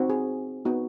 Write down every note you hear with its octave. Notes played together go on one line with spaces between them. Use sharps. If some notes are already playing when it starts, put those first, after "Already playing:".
Already playing: C4 D#4 F#4
G#4
B3 D#4 F#4